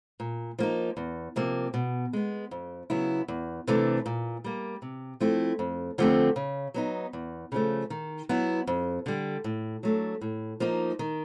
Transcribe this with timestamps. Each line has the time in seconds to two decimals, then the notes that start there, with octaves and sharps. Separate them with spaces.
0.20 A#2
0.59 F3 A#3 D#4
0.97 E2
1.36 C3 F3 A#3
1.74 B2
2.13 G#3 B3
2.51 F2
2.90 C#3 F#3 B3 E4
3.28 E2
3.67 C3 E3 A3 D4
4.06 A#2
4.44 G3 A#3
4.82 C3
5.20 F3 A3 C4 E4
5.59 F2
5.98 D3 F3 A3 C4
6.36 C#3
6.74 F#3 B3 D#4
7.13 E2
7.52 C#3 F3 A3
7.90 D#3
8.29 F#3 B3 E4
8.67 F2
9.06 D3 G3
9.44 A2
9.83 F#3 A3 D4
10.21 A2
10.60 F3 A#3 D#4
10.99 D#3